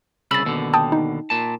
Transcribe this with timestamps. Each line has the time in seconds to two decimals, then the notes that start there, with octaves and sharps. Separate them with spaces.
0.31 C2 C#3 B5 E6 A6
0.45 D#2 B2 D3
0.74 G5 A5 D#6
0.92 D#4
1.30 A#2 A5